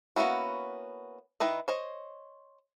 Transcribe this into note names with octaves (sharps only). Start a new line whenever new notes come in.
A#3 B3 C#4 E4 F#4
D#3 E4 B4 D#5
C5 C#5 D#5